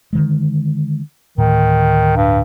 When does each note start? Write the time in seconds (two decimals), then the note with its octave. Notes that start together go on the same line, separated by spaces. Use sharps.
0.13 D3 D#3 G#3
1.38 D2 A2 D#3
2.16 G2